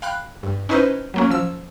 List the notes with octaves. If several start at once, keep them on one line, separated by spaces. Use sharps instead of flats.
F5 G5 B5 F6 F#6
G2
C#4 D#4 E4 B4 C5 D#5
F#3 A#3 C#4
F3 E6 E7